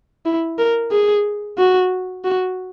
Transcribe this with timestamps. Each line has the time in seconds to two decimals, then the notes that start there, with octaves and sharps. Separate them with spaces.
0.26 E4
0.58 A#4
0.92 G#4
1.58 F#4
2.24 F#4